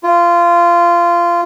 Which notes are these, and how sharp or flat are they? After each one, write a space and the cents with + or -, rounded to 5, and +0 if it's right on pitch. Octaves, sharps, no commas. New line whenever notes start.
F4 -20